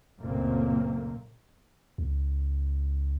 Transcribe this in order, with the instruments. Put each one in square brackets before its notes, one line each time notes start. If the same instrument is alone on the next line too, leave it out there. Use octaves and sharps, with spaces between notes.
[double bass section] F#1 C#2 A#2 A3 A#3 C4
[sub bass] C#2